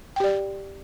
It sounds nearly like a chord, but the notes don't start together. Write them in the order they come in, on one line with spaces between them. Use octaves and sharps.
G5 G4 D5